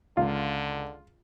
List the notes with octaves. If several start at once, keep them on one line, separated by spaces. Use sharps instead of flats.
C#2 D3 F4